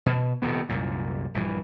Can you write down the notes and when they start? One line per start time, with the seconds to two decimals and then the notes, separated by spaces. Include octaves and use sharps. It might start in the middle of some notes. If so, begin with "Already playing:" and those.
0.06 B2
0.42 D#1 D#2 C3 B3
0.69 C2 F#2 A#2
1.34 A#1 G2 E3